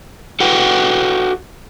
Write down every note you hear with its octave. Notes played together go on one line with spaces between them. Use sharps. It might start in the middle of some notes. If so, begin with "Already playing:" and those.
F#4 A4 B4 F#5 G5